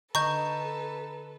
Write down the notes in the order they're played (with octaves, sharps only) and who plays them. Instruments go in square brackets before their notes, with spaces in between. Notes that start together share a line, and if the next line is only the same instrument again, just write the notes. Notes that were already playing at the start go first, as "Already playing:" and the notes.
[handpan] D3 D#5 [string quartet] A4 B4 [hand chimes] A#5 [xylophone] C#6 G6